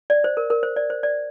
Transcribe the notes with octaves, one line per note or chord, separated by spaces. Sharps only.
D5
C5
A#4
A#4
C5
D5
C5
D5